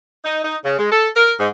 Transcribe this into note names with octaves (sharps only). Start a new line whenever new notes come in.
D#4
D#4
C#3
G#3
A4
A#4
G#2